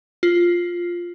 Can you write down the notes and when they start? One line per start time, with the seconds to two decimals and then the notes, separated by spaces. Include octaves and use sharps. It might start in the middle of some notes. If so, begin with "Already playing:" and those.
0.23 F4